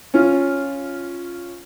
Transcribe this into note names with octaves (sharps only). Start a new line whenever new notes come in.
C#4 F4